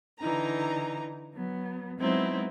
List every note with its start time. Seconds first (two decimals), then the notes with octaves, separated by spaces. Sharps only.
0.20 D3 E3 D#4 A#5
1.34 F#3 B3
1.99 F#3 G#3 B3 C4 D#4 E4